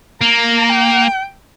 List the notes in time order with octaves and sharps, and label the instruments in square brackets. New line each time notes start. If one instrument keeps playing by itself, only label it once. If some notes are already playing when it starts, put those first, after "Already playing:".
[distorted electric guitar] A#3 [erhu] A#5
[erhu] G5